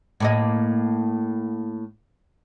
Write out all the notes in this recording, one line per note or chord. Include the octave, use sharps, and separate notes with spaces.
A2 A#3 D#5